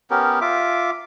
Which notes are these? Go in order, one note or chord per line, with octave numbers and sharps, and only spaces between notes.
B3 C#4 G4 A#4
F4 E5 D6